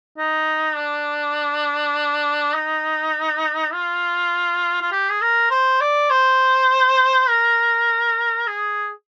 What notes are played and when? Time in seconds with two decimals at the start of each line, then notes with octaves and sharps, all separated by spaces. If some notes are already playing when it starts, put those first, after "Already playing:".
0.18 D#4
0.77 D4
2.55 D#4
3.73 F4
4.82 F4
4.92 G4
5.10 G#4
5.22 A#4
5.51 C5
5.81 D5
6.10 C5
7.29 A#4
8.47 G#4